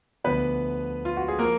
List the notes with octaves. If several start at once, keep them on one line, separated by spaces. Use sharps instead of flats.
D2 D3 F3 B3 B4
F4
F#4
G#4
F3 A#3 A#4